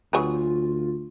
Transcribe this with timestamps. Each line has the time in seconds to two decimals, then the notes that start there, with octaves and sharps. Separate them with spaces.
0.13 D2 F#3 F4 G#4 B4